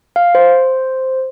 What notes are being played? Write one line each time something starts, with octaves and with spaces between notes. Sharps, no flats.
F5
C5